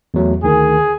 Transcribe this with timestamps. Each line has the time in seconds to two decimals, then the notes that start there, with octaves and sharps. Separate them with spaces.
0.14 E2 F#3 A3
0.44 D2 D#3 G#4